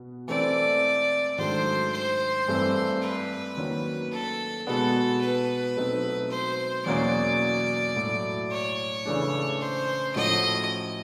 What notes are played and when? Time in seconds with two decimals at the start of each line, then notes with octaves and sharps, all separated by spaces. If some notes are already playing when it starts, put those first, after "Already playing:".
Already playing: B2 B3
0.28 E3 A3 C4 D5
1.38 G#2 D#3 F#3 A3 D4 C5
1.93 C5
2.48 G2 E3 A3 C4
3.02 B4
3.57 D#3 F#3 A#3 C#4
4.12 A4
4.67 B2 G#3 B3 A4
5.21 B4
5.76 B2 F#3 A3 C4 D#4
6.31 C5
6.86 E2 B2 F#3 A#3 C#4 D5
7.96 A2 F#3 A3
8.51 C#5
9.05 C#3 E3 A3 D4
9.61 C5
10.16 A2 F3 A3 C#4 F#4 D#5